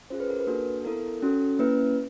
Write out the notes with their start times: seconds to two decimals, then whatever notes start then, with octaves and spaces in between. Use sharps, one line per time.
0.10 C#4 F4 G#4 C5
0.20 B4
0.30 A#4
0.40 B4
0.47 A#3 D4 F#4 A4
0.85 B3 E4 A4 A#4
1.23 C#4 F#4 A4
1.59 A#3 C#4 E4 B4